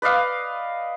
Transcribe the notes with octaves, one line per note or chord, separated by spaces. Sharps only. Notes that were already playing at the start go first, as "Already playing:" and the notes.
B4 D5 D#5 F5